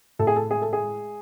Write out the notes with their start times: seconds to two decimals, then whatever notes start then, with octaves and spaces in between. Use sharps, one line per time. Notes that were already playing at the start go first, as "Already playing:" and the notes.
0.19 A2 A4
0.27 G#4
0.36 A4
0.50 G#3 G#4
0.62 A4
0.73 G#4
0.82 G#3